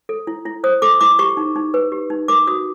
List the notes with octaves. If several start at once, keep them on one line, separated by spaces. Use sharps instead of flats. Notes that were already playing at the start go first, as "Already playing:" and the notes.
A4
E4
E4
C5 D#6
A4 D6
E4 D6
G4 C#6
D#4
D#4
B4
G4
D#4
A#4 D6
F#4 D#6